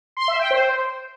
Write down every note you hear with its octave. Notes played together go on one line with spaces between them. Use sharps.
C6
E5
G5
C5